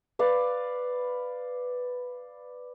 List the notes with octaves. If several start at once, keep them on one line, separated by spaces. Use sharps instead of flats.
B4 D5 F5